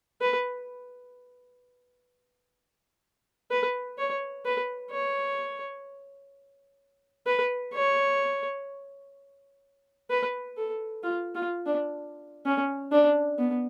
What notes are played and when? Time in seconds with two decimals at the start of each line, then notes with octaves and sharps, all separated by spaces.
0.21 B4
3.51 B4
3.98 C#5
4.45 B4
4.91 C#5
7.27 B4
7.74 C#5
10.10 B4
10.57 A4
11.03 F4
11.35 F4
11.67 D4
12.45 C#4
12.92 D4
13.39 B3